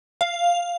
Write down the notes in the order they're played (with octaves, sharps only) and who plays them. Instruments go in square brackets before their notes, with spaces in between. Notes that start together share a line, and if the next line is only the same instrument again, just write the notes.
[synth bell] F5